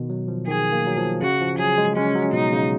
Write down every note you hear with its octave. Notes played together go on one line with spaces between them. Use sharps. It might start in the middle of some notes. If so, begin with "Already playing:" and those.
Already playing: B2 D#3
F#3
F3
D#3 G#4
A#3
F#3
F3
C#3 F#4
F3
F#3 G#4
G#3
G#3 C#4
F#3
B2 D#4
C#3